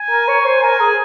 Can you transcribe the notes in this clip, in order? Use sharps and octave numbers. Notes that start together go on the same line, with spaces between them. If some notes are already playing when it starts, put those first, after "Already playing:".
Already playing: G#5
A#4
C#5
C5
A#4 G#5
G#4